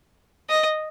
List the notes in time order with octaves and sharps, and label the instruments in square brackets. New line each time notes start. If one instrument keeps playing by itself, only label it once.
[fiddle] D#5